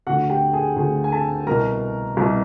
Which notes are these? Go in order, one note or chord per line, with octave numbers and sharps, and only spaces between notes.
D2 D3 F#4 F#5
G4 G5
G#4 G#5
D2 D3 G#4 G#5
G#5
A4 A5
C2 B2 A#4 A#5
C2 B2